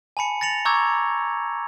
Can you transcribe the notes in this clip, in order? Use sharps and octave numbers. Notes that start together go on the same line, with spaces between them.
G#5 A5 B5 C#7
A6 A#6 C#7 F7 F#7
A#5 C#6 D6 E6 G6 G#6